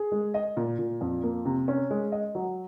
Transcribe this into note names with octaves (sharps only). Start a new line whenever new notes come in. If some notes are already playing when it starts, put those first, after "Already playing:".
Already playing: G#4
G#3
D#5
A#2
A#2
F2
A#3
C3
C#4
G#3
D#5
F#3